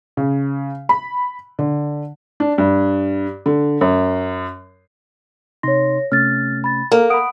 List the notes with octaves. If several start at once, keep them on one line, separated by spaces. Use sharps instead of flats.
C#3
B5
D3
D4
G2
D3
F#2
C3 D#4 C#5 C6 A#6
C3 A3 C#4 F6 A6
B5 A6
A#3 A4 A#4 A#5
F#5 B5 D#6 D7